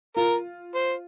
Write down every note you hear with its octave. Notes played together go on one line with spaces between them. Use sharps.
F4 A#4
C5